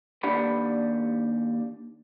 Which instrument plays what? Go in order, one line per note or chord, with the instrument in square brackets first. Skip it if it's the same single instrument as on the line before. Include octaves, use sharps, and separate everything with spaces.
[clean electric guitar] D#2 D4 G4 D5 F#5 B5